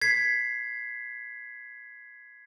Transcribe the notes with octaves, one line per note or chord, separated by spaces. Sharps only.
G#6 B6 C7